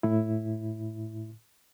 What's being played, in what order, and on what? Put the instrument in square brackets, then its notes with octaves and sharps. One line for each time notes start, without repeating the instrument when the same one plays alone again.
[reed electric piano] A2 E4